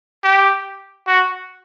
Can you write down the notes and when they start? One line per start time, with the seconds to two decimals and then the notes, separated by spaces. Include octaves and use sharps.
0.24 G4
1.08 F#4